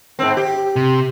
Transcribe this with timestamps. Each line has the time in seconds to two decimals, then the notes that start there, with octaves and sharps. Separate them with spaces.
0.19 G#2 C4
0.37 G4
0.76 C3